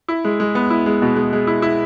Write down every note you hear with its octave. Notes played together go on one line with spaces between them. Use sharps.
E4
G#3
G#3
B3
E4
G#3
B2
G#3
G#3
E4
E4